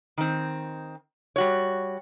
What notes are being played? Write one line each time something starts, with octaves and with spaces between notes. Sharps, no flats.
D#3 C4
G3 F#4 C#5